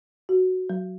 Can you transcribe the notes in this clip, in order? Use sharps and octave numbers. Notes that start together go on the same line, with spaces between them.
F#4
F#3